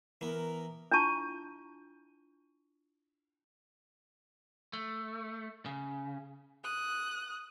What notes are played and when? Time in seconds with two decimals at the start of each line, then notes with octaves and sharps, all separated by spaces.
0.21 E3 B3 A#4
0.92 D4 E4 F4 A5 C#6
4.73 A3
5.66 C#3
6.64 D#6 F#6